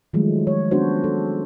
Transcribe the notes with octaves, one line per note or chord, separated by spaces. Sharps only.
D#3 F3 F#3 G#3 A3
C#5
B3 C#4 D4 F#4 C5
A4